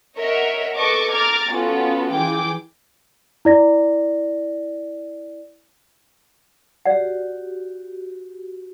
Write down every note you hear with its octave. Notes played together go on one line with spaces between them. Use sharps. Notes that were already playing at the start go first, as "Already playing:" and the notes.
A#4 C#5 D#5 E5 F#5
A4 B4 D#5 A5 C#6 D6
A#5 D6 F6 G#6 A6
B3 C#4 F4 F#4 A4
E3 G#4 G5 D6
E4 D5 A#6
F#4 G4 D5 F#5